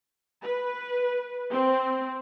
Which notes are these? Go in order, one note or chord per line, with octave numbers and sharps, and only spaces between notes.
B4
C4